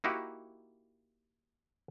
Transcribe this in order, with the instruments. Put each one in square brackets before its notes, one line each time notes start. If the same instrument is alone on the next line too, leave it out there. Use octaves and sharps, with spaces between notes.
[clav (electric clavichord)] A#3 D#4 E4 F#4 G4